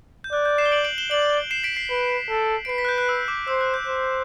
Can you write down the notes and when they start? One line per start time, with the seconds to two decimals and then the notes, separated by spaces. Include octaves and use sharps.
0.24 G6
0.33 D5 F#6
0.45 G6
0.58 C7 E7
0.66 G7
0.72 D7 F#7
0.84 D7 F#7
0.98 E7 G7
1.11 D5 D7 F#7
1.51 C7 E7
1.64 B6 D7
1.77 C7
1.90 B4
2.29 A4
2.65 D7
2.69 B4 C7
2.78 B6
2.85 F#6
2.89 G6
2.98 F#6
3.09 E6
3.28 D6
3.48 C5 E6
3.61 F#6
3.74 G6
3.87 C5